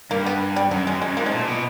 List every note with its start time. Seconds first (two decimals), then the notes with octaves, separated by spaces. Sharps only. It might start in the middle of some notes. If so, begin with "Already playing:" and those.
0.11 G2 A#3
0.26 B3
0.56 G3
0.71 F#2 F#3
0.87 F#2 G#3
1.02 F#2 G#3
1.17 G#2 A#3
1.26 G#3
1.32 A#2 A3
1.47 B2